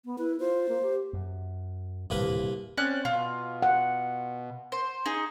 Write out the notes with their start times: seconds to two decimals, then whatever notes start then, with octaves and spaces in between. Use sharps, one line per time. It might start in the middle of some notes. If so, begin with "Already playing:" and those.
0.05 B3
0.18 E4 B4
0.40 F4 C5
0.69 A#3
0.82 G4
1.13 F#2
2.10 D#1 C2 A2 D3 A#3 B4
2.77 C4 C#4 D5 F#6
3.05 B2 F4
3.62 F#5
4.72 C5
5.06 D#4 G#4